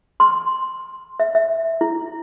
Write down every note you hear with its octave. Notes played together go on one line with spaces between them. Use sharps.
C6
E5
E5
E4